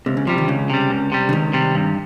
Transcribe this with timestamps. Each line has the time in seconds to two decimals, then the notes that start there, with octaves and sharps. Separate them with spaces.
0.06 C#2 C3
0.17 C#3
0.27 C3 F3 G3
0.38 D#3
0.48 C#2 C#3
0.70 C3 G3
0.90 C#2
1.12 C3 G3
1.29 C#3
1.33 C#2 D#3
1.53 C3 G3
1.75 G2